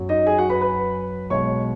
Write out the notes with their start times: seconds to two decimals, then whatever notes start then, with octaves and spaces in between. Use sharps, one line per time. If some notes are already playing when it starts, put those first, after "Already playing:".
Already playing: F#2 F#3
0.09 D#4 D#5
0.27 G#4 G#5
0.38 F#4 F#5
0.50 B4 B5
0.61 B4 B5
1.30 B1 B2 G#3 C#5 C#6